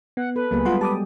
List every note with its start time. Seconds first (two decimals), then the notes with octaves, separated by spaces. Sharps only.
0.17 B3 F#5
0.36 A4 B4
0.51 C#2 F#3 A#3 B3 G#4
0.65 G3 G#3 F4 F#5 C6
0.81 G4 A5 D6 D#6